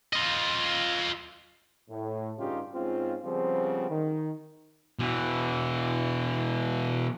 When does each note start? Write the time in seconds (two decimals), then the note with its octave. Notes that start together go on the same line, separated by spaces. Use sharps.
0.13 F4 D#5
1.90 A2
2.38 G2 C#3 C#4 D#4 F4 G4
2.74 G#2 C4 C#4 F4
3.25 C#3 F3 G3 B3 C4
3.90 D#3
4.99 B2 E3